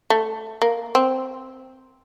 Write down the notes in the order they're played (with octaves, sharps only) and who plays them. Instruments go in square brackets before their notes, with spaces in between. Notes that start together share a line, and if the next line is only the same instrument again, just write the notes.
[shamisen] A3
A#3
C4